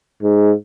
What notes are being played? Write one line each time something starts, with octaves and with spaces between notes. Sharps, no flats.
G#2